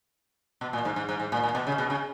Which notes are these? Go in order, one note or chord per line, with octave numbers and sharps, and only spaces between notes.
B2
A#2
G#2
G#2
G#2
G#2
A#2
A#2
B2
C#3
B2
C#3